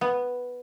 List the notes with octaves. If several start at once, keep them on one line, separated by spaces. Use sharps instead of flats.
B3